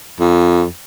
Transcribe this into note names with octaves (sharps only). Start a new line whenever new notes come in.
F2